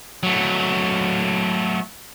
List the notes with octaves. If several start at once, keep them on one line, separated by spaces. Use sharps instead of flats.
F#3 A3